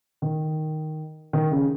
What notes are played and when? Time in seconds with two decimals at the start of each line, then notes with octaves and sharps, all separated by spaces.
0.22 D#3
1.33 D#3
1.51 C#3